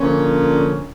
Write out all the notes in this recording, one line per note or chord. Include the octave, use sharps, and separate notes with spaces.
A#2 D3 F3 C#4